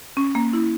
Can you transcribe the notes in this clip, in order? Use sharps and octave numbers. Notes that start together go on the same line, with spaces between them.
C#4
A#3
E4